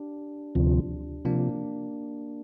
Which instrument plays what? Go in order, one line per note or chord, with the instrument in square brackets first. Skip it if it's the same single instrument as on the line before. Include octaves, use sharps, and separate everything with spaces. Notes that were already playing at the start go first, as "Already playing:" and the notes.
Already playing: [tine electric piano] D4 G4
[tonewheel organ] D2 C3 F3
[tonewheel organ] C3 F3 [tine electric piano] A#3 D4